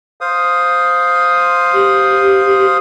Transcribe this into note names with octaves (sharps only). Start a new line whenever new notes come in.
C5 F5 D#6
G4